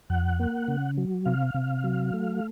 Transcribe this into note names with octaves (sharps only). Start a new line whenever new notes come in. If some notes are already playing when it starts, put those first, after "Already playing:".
F2 F#5
A#3
C#3
F#3
C3 F5
C3
F#3
A3